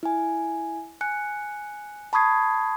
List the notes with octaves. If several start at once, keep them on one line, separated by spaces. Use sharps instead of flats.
E4 G#5
G#5 F#6 C#7
A5 B5 C#6 D#6 G#6 C7